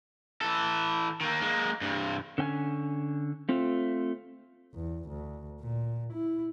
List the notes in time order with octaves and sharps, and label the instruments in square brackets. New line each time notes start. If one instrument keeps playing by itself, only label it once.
[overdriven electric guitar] E3 A4
D#3 A#3
G#3 A#3
G2 C3
[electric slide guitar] D3 C#4 G5 G#5
A3 C4 F4
[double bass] E2
D2
A#2
E4